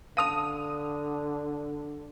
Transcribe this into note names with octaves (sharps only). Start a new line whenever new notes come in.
D3 F5 A5 D#6 D#7 F7